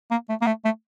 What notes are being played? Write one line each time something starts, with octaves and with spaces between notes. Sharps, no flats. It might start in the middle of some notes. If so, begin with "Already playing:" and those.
A#3
A3
A#3
A3
A3